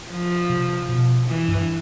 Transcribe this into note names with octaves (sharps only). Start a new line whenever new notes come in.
F3
C3
B2
E3
G2